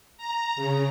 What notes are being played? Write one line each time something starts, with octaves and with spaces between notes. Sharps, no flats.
A#5
C#3